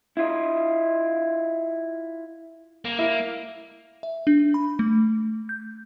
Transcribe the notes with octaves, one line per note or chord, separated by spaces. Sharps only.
E4 F4 D#5
A#3
E4
E5
D4
B5
A3
G6